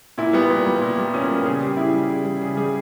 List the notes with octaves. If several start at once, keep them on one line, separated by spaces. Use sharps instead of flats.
A#2 E4
G3 B3
A#2
G3
A#2
G3
A#2 C#4
G3 A#4
C#3 G#4
G3 G4
C#3 E4
G3
C#3
G3
C#3 G#4
G3 G#4